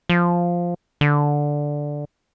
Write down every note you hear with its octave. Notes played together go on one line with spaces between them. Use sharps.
F3
D3